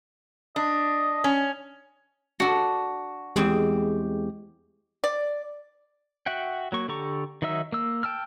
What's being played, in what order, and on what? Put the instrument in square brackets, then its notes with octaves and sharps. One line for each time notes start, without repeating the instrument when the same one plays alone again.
[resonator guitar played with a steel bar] D4 [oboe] D#5
[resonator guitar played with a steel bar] C#4
[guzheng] D4 A4 [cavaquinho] F#4
[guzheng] E2 C4 G#4 [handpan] G#3 G4
[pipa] D5
[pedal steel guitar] F#4 E5 F#5 G5
F#3 A#3 C#6
D3 G4 A4 A#5 C#6
D#3 F#3 D#4 E5 E6
A#3 E6
G5 A5 E6 F6